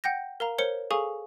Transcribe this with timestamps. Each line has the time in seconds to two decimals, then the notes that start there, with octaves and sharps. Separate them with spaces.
0.04 F#5 G5 G6 A#6
0.40 A#4 F5 A#5
0.58 A#4 C5 C#5 C#7 G7
0.91 G#4 A4 F5 G#5 C#6 D#6